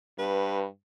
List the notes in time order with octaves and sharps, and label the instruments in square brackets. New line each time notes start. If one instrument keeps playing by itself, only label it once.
[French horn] G2 [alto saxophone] B4